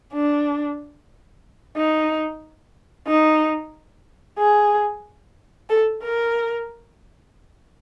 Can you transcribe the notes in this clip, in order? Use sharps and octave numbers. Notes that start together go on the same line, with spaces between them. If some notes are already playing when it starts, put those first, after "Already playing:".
D4
D#4
D#4
G#4
A4
A#4